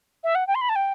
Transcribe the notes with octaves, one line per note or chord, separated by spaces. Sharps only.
E5
F#5
G5
C6
B5
A5
G5